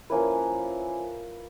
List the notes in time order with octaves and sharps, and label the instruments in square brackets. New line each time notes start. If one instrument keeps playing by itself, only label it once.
[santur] F3 A#3 C#4 E4 B4